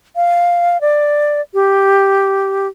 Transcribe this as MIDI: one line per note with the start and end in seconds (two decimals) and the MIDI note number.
0.16 0.80 77
0.81 1.41 74
1.54 2.67 67